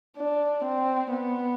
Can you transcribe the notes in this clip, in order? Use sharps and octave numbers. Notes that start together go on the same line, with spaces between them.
D4
C4
B3